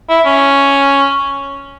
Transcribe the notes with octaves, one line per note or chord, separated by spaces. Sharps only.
E4
C#4